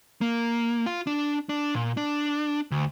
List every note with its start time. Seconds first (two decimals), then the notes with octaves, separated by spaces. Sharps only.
0.21 A#3
0.86 F4
1.07 D4
1.49 D4
1.74 A#2
1.97 D4
2.71 D2